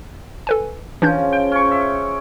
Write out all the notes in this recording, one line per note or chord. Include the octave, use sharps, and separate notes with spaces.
A4 B4 G#5
C#3 E3 F3 D4 G6
G5
C#4 C#6
E5